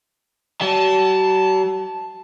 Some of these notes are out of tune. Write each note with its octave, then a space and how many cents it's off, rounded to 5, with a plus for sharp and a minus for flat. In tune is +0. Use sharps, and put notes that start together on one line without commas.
F#3 +45 A5 +0